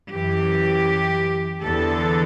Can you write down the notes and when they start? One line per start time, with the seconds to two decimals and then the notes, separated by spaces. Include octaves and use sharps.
0.13 F#2 E3 G4
1.64 E2 D3 A4